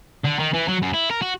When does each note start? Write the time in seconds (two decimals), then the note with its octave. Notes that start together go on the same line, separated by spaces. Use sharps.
0.25 D3
0.39 D#3
0.54 E3
0.68 F#3
0.82 F#2
0.93 E4
1.10 A#4
1.22 F#4